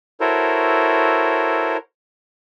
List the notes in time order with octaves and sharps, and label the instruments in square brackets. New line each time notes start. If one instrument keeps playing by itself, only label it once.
[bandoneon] E4 F#4 A4 A#4 C5 C#5